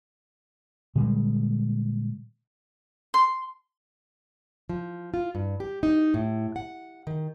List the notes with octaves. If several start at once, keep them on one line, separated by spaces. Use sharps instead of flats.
A#2 D3 G3 G#3
C6
F3
F4
G2
G4
D#4
A2
F#5
D#3